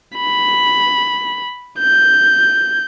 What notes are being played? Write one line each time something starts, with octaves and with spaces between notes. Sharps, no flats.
B5
G6